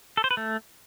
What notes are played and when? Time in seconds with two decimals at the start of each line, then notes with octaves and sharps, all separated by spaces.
0.17 A4
0.24 C5
0.31 B4
0.37 A3